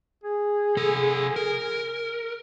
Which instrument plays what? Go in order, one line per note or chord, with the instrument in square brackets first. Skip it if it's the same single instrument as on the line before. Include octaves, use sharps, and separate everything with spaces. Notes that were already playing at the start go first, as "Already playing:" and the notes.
[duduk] G#4
[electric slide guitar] C3 A4
A#4